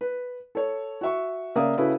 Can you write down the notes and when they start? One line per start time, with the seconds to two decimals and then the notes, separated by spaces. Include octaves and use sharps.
0.01 B4
0.55 A4 C#5
1.01 F#4 E5 C#6
1.55 C#3 A#3 D5 E5 D#6
1.78 C#3 E4 F#4 A4 B4